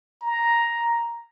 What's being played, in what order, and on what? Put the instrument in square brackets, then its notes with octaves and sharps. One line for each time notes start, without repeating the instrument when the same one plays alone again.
[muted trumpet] A#5